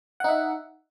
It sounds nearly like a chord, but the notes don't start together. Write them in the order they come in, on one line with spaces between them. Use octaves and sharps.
F#5 D#4 E5